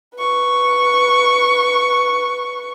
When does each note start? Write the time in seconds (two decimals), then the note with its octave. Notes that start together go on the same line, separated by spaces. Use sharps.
0.16 B4 C#6